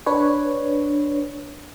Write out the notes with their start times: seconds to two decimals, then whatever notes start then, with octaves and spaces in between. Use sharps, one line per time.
0.06 D4 B4 C#5